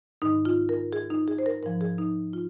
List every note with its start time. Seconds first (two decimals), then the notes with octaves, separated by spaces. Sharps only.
0.22 G#2 D#3 D#4
0.45 F4
0.69 A#4
0.93 G#4
1.10 D#4
1.28 G#4
1.38 C5
1.46 A#4
1.63 G#2 F3 A#4
1.81 G#4
1.98 D#4
2.33 F4